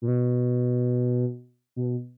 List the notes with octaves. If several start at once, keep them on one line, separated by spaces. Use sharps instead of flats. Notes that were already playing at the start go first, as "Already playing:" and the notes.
A#2
B2
B2